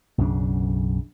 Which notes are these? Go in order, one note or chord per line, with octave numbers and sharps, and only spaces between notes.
B1 F#2 C#3 D4